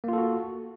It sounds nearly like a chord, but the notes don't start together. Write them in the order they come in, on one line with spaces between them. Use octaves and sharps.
A#3 F4 A4 F#4